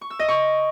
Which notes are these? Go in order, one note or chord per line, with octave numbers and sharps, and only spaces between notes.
C#6
E6
D#5
C#6